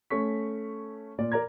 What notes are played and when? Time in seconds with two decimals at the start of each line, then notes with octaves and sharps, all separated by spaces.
0.10 A3 C#4 C#6 B6
1.18 A#2 D5
1.32 A#4 D5 A#5 G#6